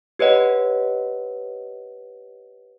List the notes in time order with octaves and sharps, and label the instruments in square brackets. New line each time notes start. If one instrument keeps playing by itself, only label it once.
[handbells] G4 B4 C#5 D#5 F#5